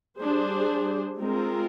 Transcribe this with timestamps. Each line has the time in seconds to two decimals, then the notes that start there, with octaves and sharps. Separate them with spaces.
0.18 G3 D4 G#4 C5
1.19 G#3 C4 F4 A#4